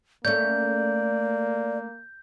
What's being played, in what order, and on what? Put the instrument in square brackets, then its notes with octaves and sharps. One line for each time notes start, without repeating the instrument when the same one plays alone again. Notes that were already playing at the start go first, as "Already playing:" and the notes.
[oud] A3 C#4 [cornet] A#3 [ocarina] D5 [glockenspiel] G6